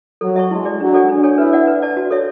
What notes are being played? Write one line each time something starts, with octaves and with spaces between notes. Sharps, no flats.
F#3 A4
E5 A5 C#6
G#3 E4
G#4 D5
F#3 D4
A4 D5 G#5
D4
A4 C#5 G#5
E4 B4
D5 F#5
B4
D5 A5
F#4
A4 C#5 E5